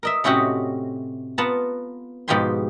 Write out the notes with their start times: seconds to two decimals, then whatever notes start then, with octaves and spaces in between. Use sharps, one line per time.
0.03 A#4 D#5 E5
0.24 A2 C3 C#4 F#4 G4 D#5
1.38 B3 F4 F#5 A5 A#5
2.28 G#2 B2 F3 G4 G#5 C6